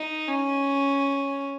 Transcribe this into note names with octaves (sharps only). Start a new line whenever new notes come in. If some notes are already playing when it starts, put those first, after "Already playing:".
Already playing: D#4
C#4